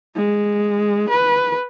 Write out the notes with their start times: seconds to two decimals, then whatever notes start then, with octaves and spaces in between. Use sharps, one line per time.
0.16 G#3
1.10 B4